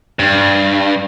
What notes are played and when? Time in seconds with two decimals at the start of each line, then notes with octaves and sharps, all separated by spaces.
0.19 G2